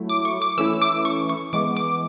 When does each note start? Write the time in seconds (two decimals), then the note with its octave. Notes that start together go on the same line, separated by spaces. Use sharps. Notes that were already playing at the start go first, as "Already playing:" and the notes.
Already playing: F#3 A3 E4
0.09 D6
0.25 C#6
0.42 D6
0.57 E3 A3 C#4 E4 E6
0.82 D6
1.05 C#6
1.29 C#6
1.53 E3 G#3 B3 D6
1.77 D6